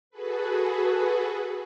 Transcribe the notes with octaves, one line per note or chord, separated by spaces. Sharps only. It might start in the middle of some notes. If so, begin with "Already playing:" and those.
F#4 G#4 A4 B4